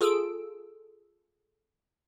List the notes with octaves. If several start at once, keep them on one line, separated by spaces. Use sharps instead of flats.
F4 G#4 A4 E6 D7